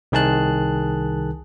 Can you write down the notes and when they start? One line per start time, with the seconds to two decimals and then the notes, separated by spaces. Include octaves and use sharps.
0.12 C2 D#3 G#4 A5 F#6